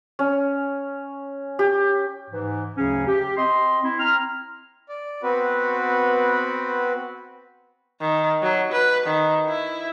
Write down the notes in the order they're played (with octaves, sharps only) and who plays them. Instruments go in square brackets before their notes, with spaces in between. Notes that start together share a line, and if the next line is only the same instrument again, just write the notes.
[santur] C#4
G4
[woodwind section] G#2 E3
D2 C#3 F#3 C#4 G#4
G4
C4 D#5 C6
C4 E4
C4 A#5 F6
[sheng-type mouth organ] D5
B3 C4 F#4 B4
[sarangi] D#3
F#3
B4
D#3
E4